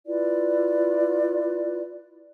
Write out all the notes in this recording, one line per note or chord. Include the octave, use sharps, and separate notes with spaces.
E4 F4 B4 D5